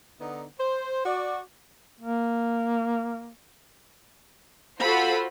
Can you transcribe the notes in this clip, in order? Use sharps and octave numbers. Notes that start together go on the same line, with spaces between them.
D3 B3 D#4
C5
F#4 D5
A#3
F4 F#4 A4 C5 B5